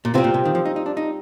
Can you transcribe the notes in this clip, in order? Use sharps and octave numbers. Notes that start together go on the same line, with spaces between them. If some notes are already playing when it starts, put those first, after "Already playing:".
A#2
C3 G3 C4 F4
A#2
C3
D#3
F3
D#4
D#4
D4
D#4